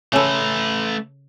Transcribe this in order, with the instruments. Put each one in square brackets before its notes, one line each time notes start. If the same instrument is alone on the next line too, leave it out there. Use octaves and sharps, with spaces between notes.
[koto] C#3 A4 [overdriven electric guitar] A3 B4